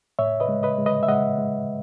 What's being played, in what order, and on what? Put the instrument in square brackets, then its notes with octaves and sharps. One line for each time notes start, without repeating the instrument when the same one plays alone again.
[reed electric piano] A2 C#5 E5
B4 D#5
G#3
B4 D#5
G#3
B4 D#5
E5
G#3 D#5 F#5
G#3